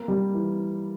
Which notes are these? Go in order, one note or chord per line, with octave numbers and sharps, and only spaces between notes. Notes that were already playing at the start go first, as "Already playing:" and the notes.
Already playing: A#3
G3
E3